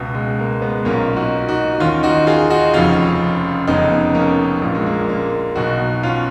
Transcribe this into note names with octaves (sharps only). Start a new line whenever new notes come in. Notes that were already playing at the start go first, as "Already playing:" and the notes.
Already playing: C#2 B2
G#3
A#3
G#3 B3
B1 A#2 A#3 C#4
D#4 F#4
D#4 F#4
D#2 D#3 C#4 F4
D#4 F#4
F4 G#4
D#4 F#4
F1 F2 C#3 C#4 F4
F1 F2 C#3 B3 D#4
A#3 C#4
A#1 A#2 A#3
G#3
A#3
A#3
B1 B2 D#4 F#4
C#4 F4